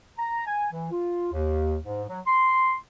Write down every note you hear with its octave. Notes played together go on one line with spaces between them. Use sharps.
A#5
G#5
E3
F4
D#2
G#2
F#3
C6